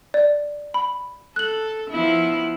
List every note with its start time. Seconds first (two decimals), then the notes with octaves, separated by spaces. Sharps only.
0.14 D5
0.74 B5
1.36 A4 F#6 F#7
1.90 F3 B3 E4